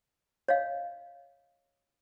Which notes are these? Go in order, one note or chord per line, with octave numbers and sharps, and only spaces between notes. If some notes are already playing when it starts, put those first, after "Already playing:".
C#5 D#5 F5